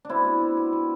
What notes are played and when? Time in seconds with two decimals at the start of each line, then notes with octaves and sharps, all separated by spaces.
0.05 B2 C4 D4 E4
0.25 B2
0.41 B2
0.57 B2
0.73 B2